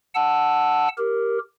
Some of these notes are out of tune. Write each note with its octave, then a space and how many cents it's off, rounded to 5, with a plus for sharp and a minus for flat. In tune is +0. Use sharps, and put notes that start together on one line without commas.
F#5 +0 A5 +0 E6 +0
G4 +0 A#4 +0